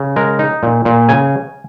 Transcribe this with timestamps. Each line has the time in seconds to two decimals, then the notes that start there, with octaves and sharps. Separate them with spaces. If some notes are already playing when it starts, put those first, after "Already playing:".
Already playing: C#3
0.16 G#3 A#4
0.39 D#4
0.63 A#2
0.85 A#2
1.09 C#3 G#5